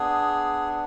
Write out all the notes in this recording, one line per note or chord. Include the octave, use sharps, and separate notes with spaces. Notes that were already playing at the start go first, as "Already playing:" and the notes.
Already playing: B3 D4 G#4